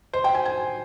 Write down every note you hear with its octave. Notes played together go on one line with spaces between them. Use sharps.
C5
G5
G#5
G#5